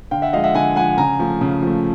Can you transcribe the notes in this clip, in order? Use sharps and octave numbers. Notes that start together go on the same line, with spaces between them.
D3 F5 G5
E5 F#5
F3 G#3 D#5 F5
E5 F#5
D3 F#5 G#5
F3 G#3 F#5 G#5
C#3 G#5 A#5
F3 A3
C#3
F3 A3